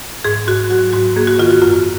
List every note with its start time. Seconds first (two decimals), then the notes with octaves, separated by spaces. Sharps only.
0.24 G#2 G#4
0.48 G#2 F#4
0.70 F#3 F#4
0.93 G#2 F#4
1.16 A#3 G#4
1.27 F#4
1.38 D#3 F4
1.50 F#4
1.62 F#2 F4